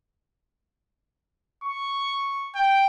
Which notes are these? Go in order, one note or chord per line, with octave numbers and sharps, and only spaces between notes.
C#6
G5